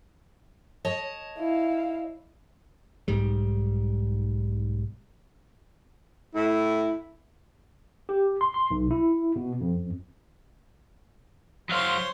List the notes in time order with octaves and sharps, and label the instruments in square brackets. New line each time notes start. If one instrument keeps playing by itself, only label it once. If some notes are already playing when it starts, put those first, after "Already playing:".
[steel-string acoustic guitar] C#5 D#5 A5
[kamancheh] E4 F5
[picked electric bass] B1 G#2 G3
[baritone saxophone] A2 [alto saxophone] E4
[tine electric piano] G4
C6
C6
B1
E4
B2
F2
[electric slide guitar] F#3 F5 [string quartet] C5 C#5 C6